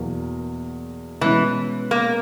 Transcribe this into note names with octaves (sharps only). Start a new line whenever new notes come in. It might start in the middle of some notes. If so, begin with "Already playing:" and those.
Already playing: E2 B2 F#3 A#3
B2 E3 G#3 C#4 E4
A#3